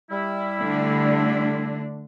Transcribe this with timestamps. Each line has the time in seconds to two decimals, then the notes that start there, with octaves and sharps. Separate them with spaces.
0.11 G3 E4
0.59 D3 A3 D4